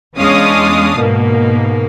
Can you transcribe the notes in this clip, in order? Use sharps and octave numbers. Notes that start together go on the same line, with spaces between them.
E2 G#3 C#4 D4 F5 D#6
G#2 B2 A#3